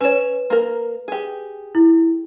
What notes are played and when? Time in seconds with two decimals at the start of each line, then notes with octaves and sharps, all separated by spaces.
0.01 C#4 B4 C#5 E7
0.50 A#3 A#4
1.08 G4 G#4
1.75 E4